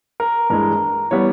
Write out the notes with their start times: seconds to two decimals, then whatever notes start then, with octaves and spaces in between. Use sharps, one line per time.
0.20 A#4
0.50 G2 E3 G#3 A#4
1.11 E3 G3 B3 C#5